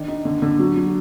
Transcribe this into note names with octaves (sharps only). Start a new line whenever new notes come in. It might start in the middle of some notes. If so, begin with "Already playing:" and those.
Already playing: D#3 D4
D#4
D3
D3
F#3
F#3